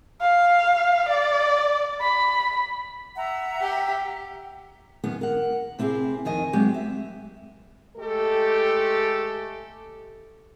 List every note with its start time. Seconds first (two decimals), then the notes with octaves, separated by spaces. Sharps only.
0.22 F5
1.08 D5
2.01 B5
3.16 E5 F#5 A#5
3.61 G4
5.04 F#2 D#3 B3 C#4
5.21 A#4 F#5
5.79 C3 C4 E4 G4 G#4
6.25 F2 D#3 D#5 G#5
6.53 F#3 G#3 C4 G4 C#5
6.74 E5
7.97 G#3 A3 G4 A4